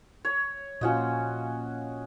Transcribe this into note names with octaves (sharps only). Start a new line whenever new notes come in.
C#5
A#2 C#4 F4 F#4 D#5